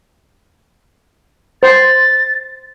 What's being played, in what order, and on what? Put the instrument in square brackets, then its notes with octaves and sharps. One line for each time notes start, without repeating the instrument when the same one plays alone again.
[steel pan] C5 [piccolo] A6